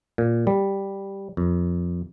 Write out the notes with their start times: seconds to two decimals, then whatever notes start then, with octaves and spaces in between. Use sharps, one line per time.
0.18 A#2
0.47 G3
1.37 F2